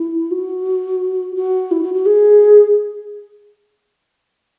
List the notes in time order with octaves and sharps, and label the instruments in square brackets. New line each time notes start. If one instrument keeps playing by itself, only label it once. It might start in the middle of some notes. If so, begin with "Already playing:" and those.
Already playing: [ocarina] E4
F#4
F#4
E4
F#4
F#4
G#4